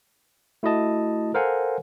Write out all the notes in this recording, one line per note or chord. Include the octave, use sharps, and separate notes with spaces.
A3 E4 F#4 D#5 A5
A4 A#4 C5 F5 F#5 G#5